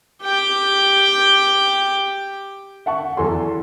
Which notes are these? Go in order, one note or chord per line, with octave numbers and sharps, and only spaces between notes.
G4 G5
E5 F#5 A5 C#6
E2 F#3 A4 G#5 C6